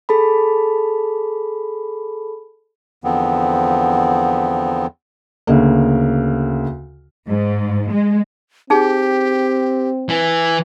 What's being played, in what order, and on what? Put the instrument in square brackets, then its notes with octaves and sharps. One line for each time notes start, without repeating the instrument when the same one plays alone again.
[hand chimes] G#4 A4 A5 B5
[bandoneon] E2 D3 F3 B3 C4
[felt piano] D2 C#3 A#3
[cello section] G#2
G#3
[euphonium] C4 [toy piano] D#4 G#4 [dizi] G4
[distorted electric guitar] E3